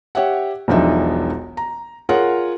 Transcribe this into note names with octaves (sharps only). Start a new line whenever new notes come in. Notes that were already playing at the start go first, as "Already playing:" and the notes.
G4 C#5 E5 F#5
E1 B1 F3 D4 D#4 E5
A#5
F4 G#4 A#4 C#5 F#5